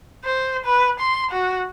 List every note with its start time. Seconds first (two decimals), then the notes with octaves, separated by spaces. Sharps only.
0.25 C5
0.65 B4
1.00 C6
1.31 F#4